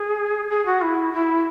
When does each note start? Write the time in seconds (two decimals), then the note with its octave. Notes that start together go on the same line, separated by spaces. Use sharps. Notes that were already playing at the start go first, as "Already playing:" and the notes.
Already playing: G#4
0.50 G#4
0.66 F#4
0.82 E4
1.13 E4